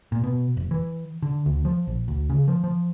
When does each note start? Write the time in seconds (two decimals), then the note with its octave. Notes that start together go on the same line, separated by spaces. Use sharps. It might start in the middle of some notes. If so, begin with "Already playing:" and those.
0.12 A#2
0.24 B2
0.57 F1
0.71 E3
1.22 D3
1.46 D2
1.65 F3
1.87 A#1
2.08 D2
2.30 C#3
2.48 F3
2.64 F3